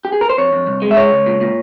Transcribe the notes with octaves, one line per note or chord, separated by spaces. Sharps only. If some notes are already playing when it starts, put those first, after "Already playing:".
G4
G#4
A#4
C5
F2 C#5
F2
C2
G#3
E5
C#2 C#5
C#2
A#2
A#2